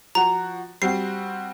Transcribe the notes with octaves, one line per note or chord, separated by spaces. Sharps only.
F3 F#4 A#5
G3 C4 F#4 C7